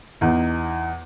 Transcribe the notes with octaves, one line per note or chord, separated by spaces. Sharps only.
E2 D#4